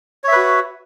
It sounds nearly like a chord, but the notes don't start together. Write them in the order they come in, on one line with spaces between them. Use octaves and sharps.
C#5 E5 B4 F#4